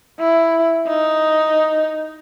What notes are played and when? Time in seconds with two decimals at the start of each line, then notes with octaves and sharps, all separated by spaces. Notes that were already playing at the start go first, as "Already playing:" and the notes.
0.19 E4
0.88 D#4